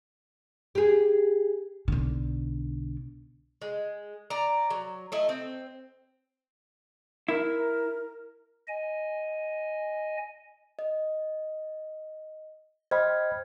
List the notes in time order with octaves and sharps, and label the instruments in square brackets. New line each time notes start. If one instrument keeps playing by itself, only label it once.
[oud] G4 G#4
[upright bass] B1 D3
[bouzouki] G#3
D5 A#5
F#3
A3 E4 D#5
C4
[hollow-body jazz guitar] E4 [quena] A#4
[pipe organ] D#5 G#5
[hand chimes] D#5
[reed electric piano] C5 D#5 B5 [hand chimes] G5 F6 G#6